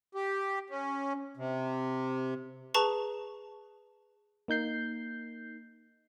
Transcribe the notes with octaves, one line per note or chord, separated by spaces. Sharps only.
G4
C#4
C3
G#4 B4 A5 A#5 C#6
A#3 D#4 G6 C7